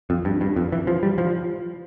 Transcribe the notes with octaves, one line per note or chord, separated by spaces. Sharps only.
F2
G2
G2
F2
E3
F3
G3
F3